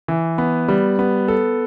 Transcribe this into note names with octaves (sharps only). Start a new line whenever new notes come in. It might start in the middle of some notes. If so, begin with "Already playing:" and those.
E3
B3
G3
B3
A4